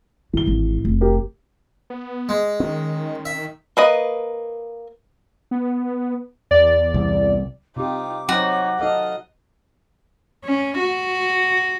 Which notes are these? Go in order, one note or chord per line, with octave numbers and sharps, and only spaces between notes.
G2 D3 E3 G7
G#1 G#2
F1
G4 A#4
B3
G#3
D#3 C4 C#4
E5
A#3 B4 D#5
B3
E2 D5
C2
C3 D#4 F4 G4 D6
F#3 D#4 F#4 C5 C#5
D#4 A4 D#5 F5
C#4
F#4